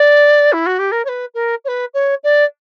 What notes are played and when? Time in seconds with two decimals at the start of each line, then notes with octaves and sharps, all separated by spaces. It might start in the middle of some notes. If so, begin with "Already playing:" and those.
Already playing: D5
0.53 E4
0.66 F#4
0.79 G4
0.92 A#4
1.05 C#5
1.09 B4
1.34 A#4
1.65 C#5
1.68 B4
1.94 C#5
2.24 D5